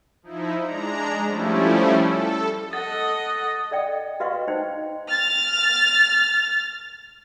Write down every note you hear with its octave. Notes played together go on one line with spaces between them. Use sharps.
F3 D#4 E4
G#3 D4 A#5
F3 G3 A3 C#4 E4
A4
A4 D#5 F#5 A6
A4 D5 D#5 G5
F#4 B4 D#5 F5 C6 C#6
D#4 C5 G5
F6 A6